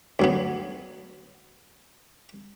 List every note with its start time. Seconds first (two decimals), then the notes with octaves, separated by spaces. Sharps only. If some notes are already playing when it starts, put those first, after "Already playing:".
0.19 D2 F#3 B3